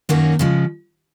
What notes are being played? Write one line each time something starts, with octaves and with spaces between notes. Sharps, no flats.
F#2 D#3 A#3 C#4 F#4
C#3 F3 G#3